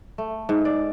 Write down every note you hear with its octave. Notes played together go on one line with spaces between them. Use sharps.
A3
G#2
D5